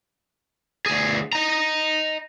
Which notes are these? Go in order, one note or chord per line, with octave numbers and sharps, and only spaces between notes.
D2 G#4
D#5 A#5